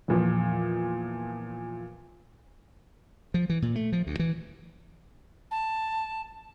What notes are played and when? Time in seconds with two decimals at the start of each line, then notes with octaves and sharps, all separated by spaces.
0.08 E2 A#2 F3
3.34 F3
3.50 E3
3.62 A#2
3.76 A3
3.92 F3
4.07 D2
4.19 E3
5.51 A5